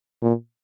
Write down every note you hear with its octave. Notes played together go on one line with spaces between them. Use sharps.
A#2